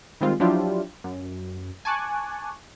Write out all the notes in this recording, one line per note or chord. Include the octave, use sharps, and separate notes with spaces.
D#3 G3 G#3 C4 F4
F3 F#3 D4 E4 F4 G4
F#2
G#5 A5 C#6 D6 F#6